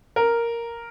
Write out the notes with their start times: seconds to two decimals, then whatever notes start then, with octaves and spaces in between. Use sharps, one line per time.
0.16 A#4